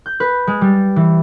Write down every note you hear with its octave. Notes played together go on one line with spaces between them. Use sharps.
G6
B4
G#3
G3
E3